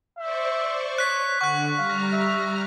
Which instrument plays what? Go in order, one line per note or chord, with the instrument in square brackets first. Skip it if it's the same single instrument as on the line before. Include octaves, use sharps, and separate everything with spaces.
[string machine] C5 D5 C#6 [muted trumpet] E5
[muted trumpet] C#5 [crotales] F#6 B6
[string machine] D3 [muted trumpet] F#5 [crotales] C#6 F#6
[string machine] G3 A#5 F6 [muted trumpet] F5
[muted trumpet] E5